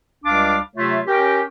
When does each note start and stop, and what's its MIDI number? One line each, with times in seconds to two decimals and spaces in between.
0.24 0.58 37
0.24 0.58 55
0.24 0.58 62
0.24 0.58 77
0.24 0.58 86
0.76 0.99 48
0.76 0.99 54
0.76 0.99 57
0.76 0.99 65
0.76 0.99 73
0.76 0.99 76
1.07 1.41 61
1.07 1.41 67
1.07 1.41 70
1.07 1.41 79